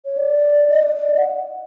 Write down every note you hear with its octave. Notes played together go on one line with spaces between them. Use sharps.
C#5
D5
D#5
D5
D5
D#5
F#5